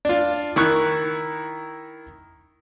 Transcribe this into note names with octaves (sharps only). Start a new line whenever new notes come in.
D4 F4
D#3 E4 C#6 F#6